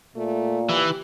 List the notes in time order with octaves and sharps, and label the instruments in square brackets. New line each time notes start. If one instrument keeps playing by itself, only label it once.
[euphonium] A#2 [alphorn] A3
[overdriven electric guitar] E3 [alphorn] G4